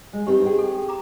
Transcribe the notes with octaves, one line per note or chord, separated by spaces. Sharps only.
G#3
G2 C4 D#4 G4
C4 G#4 G5
A4
A#5 D6